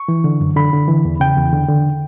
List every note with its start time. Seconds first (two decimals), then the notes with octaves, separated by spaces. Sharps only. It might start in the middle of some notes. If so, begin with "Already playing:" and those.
Already playing: C#6
0.08 E3
0.24 D3
0.41 F#2
0.56 D3 B5
0.73 D3
0.88 E3
1.05 E2
1.20 C#3 G5
1.36 E2
1.53 D3
1.68 D3